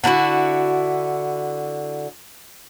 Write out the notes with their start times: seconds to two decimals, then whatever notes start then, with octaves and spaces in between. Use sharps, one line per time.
0.04 D3 D4 E4 F#4